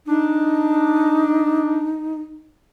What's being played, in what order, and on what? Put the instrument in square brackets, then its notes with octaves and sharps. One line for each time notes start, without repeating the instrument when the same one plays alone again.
[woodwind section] D4 [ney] D#4